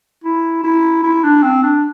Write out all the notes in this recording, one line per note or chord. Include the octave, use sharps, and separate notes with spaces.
E4
E4
E4
D4
C4
D4